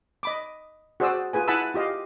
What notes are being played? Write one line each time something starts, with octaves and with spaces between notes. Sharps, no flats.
D#5 B5 D6
F#4 G#4 C5 D5 D#6 E6
F4 G#4 B4 G#5
E4 F#5 G#5 A5 B5 E6
F4 G4 D#5 F5